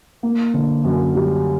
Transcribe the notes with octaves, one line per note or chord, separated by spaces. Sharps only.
A#3
D3
F#2
G3